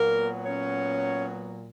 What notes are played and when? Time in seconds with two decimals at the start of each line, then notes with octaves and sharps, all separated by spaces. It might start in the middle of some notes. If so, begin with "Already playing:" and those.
Already playing: A#2 F#3 A#3 B3 A#4
0.45 C#4 C#5